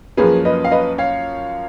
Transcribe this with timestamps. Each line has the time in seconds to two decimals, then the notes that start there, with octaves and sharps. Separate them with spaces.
0.17 F#2 F3 A#3 C#4 G#4 B4
0.45 B4 D#5
0.64 F5
0.71 B4 D#5
0.98 C#5 F5